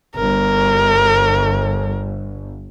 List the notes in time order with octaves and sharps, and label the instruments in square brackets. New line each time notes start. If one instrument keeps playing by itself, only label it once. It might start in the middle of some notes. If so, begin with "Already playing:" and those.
[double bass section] G1 [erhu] A#4